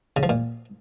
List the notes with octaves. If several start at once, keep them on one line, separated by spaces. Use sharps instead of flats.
C#3
F3
A#2